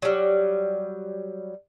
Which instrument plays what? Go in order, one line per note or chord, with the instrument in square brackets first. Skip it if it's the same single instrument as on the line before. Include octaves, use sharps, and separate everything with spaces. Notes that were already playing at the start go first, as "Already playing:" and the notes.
[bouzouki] F#3 G3